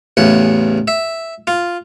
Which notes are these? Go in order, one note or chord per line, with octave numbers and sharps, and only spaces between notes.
A1 E2 C#3 F#5
E5
F4